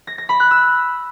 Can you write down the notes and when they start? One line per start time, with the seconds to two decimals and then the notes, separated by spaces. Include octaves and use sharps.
0.07 A#6
0.18 A#6
0.29 B5
0.40 F#6
0.51 E6